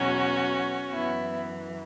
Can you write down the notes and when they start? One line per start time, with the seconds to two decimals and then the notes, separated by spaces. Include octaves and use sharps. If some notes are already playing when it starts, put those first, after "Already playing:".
Already playing: E2 B2 F#3 C#4 F#4
0.92 F#2 E3 B3 E4